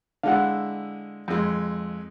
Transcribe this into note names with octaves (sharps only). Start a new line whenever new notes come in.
D3 G#3 E4 F5 F#5
F2 G#3